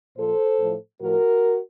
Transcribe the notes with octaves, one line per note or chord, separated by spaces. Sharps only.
A#2 F3 A4 C5
A2 F3
A2 F3 F#4 A#4